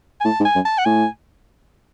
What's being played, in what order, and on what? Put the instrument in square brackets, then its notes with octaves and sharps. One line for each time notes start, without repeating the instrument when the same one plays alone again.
[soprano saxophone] G#5
[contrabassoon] A2 [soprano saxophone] A5
[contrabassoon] G#2
[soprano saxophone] G#5
[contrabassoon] F#2
[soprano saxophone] A5
F#5
[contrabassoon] A2 [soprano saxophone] G#5